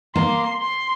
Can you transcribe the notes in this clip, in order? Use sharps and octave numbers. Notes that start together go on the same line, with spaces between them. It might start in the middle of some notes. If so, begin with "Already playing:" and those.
A#3 C6
C6